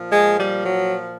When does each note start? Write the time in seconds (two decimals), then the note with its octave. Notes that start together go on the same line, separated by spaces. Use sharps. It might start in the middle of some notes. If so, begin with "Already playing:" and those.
Already playing: A#2 F3
0.10 G#3
0.38 G3
0.66 F#3